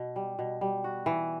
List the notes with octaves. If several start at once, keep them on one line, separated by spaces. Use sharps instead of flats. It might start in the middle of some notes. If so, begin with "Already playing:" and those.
Already playing: B2
G3
B2
G3
F#4
E3